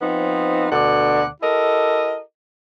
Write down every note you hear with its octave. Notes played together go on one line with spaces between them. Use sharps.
F3 B3 C4 D#4
D2 B2 D3 D5 F#5
E4 G4 A4 A#4 D#5